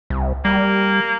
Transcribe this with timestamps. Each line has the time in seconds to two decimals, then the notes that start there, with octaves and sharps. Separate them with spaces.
0.10 C2
0.45 G3 A#3